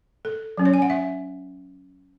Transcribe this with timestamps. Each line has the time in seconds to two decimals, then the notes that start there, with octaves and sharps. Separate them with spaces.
0.25 A4
0.58 F#3 C#4
0.65 C#5
0.74 G#5
0.82 F#5
0.90 E5